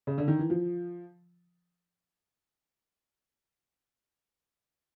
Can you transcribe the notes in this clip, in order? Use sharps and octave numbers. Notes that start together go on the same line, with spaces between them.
C#3
D3
D#3
E3
F3